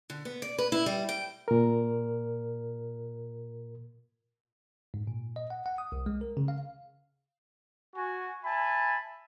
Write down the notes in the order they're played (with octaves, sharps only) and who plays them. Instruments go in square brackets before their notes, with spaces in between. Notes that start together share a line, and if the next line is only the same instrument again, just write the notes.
[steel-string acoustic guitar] D3
B3
D5
B4
E4
G3
G5
[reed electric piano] A#2 A#4
[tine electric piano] G#2
A#2
D#5
F#5
F#5
D#6
C2
G#3
A#4
C#3
F5
[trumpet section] F#4 G#5
E5 G#5 A5 B5